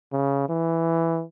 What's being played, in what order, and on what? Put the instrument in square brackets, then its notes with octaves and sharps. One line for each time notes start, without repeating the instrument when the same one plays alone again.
[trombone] C#3
E3